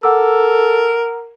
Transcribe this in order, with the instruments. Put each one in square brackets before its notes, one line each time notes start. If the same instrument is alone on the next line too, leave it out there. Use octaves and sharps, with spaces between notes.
[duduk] A4 [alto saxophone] A#4 [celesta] F#5 D6 E6